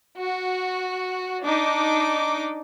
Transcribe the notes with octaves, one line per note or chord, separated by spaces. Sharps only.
F#4
D4 D#4 D6